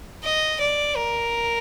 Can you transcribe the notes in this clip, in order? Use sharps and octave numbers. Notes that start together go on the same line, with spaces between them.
D#5
D5
A#4